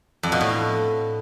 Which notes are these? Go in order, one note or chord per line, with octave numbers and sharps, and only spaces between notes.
F2
B2
A2